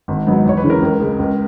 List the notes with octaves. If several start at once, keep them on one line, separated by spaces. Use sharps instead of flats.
G#1
G#2 F#3 B3
E2 C#5
B4
C#3 E3
A#4
C#2
C#3 G#3
C#2